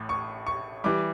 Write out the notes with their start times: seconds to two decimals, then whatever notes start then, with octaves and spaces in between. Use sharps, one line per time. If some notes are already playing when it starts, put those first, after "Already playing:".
Already playing: A1 A2
0.09 C#6
0.47 C#6
0.84 E3 G3 D6